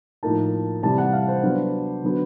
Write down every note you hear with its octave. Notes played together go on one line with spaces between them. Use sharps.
A2 F3 A#3 D#4 A5
C3 E3 G3 A5
F#5
F5
C5
F#3 B3 D4
D3 F#3 B3